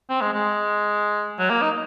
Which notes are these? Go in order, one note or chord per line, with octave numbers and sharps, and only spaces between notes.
C4
G#3
G#3
F#3
A#3
D#4